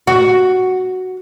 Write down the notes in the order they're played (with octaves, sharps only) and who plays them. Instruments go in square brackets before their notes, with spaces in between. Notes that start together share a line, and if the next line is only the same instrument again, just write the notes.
[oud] F#4